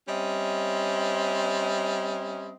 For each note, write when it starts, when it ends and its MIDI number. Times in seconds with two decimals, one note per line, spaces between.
0.08 2.54 55
0.08 2.54 60
0.08 2.54 61
0.08 2.54 75
0.08 2.54 76